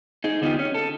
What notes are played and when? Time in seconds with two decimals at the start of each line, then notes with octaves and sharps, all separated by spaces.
0.24 D#4 G#4
0.42 D3 B3 D#4 F4 G4
0.59 C#4
0.74 A4